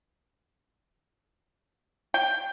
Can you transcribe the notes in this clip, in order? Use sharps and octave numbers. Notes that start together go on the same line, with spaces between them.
G5